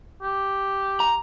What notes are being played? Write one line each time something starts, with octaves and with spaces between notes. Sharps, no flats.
G4
A#5